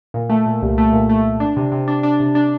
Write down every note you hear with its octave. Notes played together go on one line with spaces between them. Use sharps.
A#2
A3
A#2
C2
A3
A#2
A3
A3
D4
C3
C3
D4
D4
C3
D4